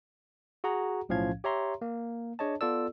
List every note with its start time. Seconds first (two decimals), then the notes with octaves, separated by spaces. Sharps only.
0.64 F#4 G#4 F#5 A#5
1.09 B1 A2 F3 C#4 F5 G#6
1.44 G4 C#5 E5 A#5 C6
1.82 A#3
2.39 D4 G#4 C#5 D#5 A5
2.61 B3 F4 A4 D5 E6